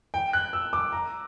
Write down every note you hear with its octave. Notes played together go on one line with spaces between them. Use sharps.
G5
F#6
E6
D6
A#5